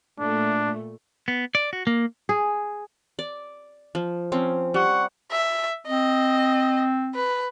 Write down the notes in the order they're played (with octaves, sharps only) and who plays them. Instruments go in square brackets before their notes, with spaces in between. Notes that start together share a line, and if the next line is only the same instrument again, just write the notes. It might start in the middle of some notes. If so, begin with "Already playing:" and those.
[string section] A#2 A3 [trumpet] D4
[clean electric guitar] B3
D5
F#4
A#3
[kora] G#4
[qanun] D5
F3
F3 C4 C#4
[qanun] G3 [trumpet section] F#5 C#6
[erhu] E5
[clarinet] C4 [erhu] D#5
[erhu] B4